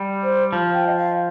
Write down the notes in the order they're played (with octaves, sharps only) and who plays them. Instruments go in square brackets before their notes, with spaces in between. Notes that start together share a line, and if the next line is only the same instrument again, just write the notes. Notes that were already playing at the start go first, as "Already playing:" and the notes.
Already playing: [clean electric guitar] G3
[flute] C5
[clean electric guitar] F3
[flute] G5
D#5
F5